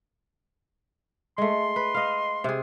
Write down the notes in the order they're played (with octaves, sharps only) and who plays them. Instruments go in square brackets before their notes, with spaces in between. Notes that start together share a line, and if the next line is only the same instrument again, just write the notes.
[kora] G#3 A3 [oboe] C6
[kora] B4
D#5 F5
C3 G#4